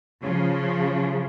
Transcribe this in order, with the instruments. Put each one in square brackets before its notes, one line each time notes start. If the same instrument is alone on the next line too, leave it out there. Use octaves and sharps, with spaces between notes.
[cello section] C#3 F3